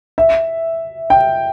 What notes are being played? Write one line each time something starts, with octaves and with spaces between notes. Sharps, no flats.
E5
G5